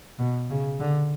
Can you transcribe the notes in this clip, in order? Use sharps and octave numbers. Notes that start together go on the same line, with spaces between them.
B2
C#3
D3